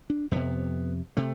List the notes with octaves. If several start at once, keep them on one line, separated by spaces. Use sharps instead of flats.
D4
F2 C3 B3
C3 A3